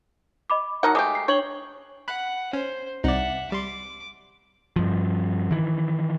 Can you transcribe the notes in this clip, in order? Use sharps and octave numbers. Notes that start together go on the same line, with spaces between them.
D#5 B5 D6
F#3 D#4 A#4 F#5 A5 F6
G#3 A3 G4 G#5 D6 D#6
C7
D4 C#5 F#7 G7
F#5 B5 F#6
C#4 C5
C2 D#4 D5 E5 F#5
G3 C6 D6
G2 F3
D#3 E3